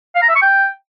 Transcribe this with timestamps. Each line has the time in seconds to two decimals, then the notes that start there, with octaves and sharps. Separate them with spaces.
0.16 F5
0.22 A#5
0.29 E5
0.35 C#6
0.42 G5